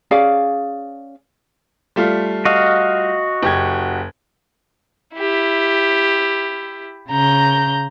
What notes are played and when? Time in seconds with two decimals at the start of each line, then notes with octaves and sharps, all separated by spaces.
0.11 C#4 G#4 D5 F5
1.96 G3 A3 F4
2.45 F#4 D#5 F5
3.43 F#1 G4 G#6
5.16 E4 G4
7.09 C#3 A#5 G6